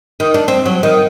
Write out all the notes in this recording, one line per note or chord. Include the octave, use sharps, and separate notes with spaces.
D#3
D4
C4
F#3
D#3